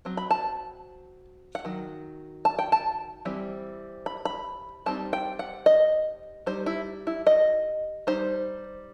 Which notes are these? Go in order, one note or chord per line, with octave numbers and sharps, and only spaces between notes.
F#3 C4
B5
A5
F#5
D#3 F#3
A5
G5
A5
E3 G3 C4
B5
B5
G3 C4 D#4 A5
G5
F#5
D#5
G3 D#4 C5
E4
E4
D#5
G3 D#4 C5